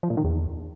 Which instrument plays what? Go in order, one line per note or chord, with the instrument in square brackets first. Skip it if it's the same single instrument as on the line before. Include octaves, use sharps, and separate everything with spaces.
[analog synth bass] F3
A#2
D#3
E2